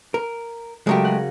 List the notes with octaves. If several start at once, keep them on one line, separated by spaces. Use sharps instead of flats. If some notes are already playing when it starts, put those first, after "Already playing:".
A#4
C#3 F#3 G#3 A3 G4 A#4
G#4 F#5 F#6